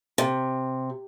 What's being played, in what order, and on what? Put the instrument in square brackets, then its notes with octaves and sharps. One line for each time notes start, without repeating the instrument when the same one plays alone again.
[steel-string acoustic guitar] C3